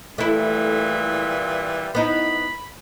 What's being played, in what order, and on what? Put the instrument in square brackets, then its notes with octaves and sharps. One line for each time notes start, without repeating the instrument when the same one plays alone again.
[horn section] A#2 E3 G3 [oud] A3 E4
[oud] B3 D#4 E4 [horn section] B5